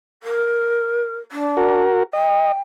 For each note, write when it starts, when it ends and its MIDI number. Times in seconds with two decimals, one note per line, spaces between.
0.23 1.17 70
1.31 1.83 62
1.57 2.03 66
1.57 2.03 70
2.13 2.52 75
2.13 2.59 79